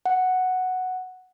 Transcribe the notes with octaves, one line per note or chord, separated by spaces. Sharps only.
F#5